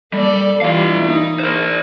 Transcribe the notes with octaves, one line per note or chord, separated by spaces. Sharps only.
G3 A#3 A4 D5
E3 G3 E4 F4 F5
A#3 D#4
A#4 C5